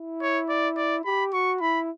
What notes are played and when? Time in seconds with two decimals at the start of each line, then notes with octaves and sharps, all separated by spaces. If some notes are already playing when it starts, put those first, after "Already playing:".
Already playing: E4
0.22 C#5
0.49 D5
0.77 D5
1.05 G4 B5
1.33 F#4 C#6
1.61 E4 B5